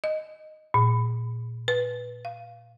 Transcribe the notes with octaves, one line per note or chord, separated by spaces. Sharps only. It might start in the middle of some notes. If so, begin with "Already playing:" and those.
D#5
A#2
B4
F5